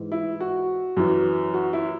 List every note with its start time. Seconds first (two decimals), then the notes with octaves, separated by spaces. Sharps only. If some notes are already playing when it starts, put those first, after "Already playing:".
Already playing: G#2 E3
0.12 E4
0.40 F#4
0.97 F#2 E3
1.54 F#4
1.73 E4